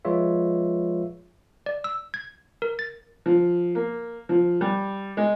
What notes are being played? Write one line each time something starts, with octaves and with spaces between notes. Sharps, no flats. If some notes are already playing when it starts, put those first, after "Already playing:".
F3 G#3 F4 B4 C#5 E5
D5
E6
G#6
A#4
A6
F3
A#3
F3
G3
G#3